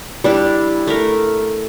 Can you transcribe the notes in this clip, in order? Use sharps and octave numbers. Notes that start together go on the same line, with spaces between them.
G3 D4 E4
A3 A#4